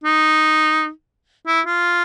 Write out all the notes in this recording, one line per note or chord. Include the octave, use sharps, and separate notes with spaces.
D#4
E4
F4